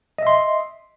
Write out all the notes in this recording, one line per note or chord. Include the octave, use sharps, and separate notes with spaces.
D#5 E5 C6